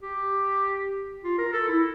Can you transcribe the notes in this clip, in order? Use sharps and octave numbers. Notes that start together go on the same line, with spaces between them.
G4
F4
A#4
A4
E4